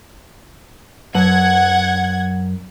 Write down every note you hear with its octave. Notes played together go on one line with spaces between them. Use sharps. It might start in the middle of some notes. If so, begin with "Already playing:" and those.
F#2 F#3 F#5 G#6 F#7